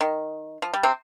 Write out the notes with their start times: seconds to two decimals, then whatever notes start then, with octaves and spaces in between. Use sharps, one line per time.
0.01 D#3
0.62 F3
0.74 G3
0.83 C3 C4